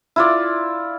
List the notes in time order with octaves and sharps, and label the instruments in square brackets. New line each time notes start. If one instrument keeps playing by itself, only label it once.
[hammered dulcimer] E4 F4 D5